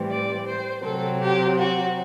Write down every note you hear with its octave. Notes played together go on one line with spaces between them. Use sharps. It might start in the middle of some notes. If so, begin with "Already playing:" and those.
Already playing: A2 E3 G3 C4
D5
C5
C3 F#3 C4 A4
G4
F#4